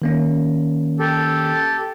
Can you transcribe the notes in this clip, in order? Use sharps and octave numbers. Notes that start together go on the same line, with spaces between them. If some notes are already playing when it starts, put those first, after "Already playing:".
D#3 A#3 C#4
G4 A4